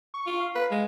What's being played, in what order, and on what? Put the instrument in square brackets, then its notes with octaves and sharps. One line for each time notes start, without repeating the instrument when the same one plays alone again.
[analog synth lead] C#6
[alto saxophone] F4
[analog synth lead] F5
[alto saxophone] B4
G#3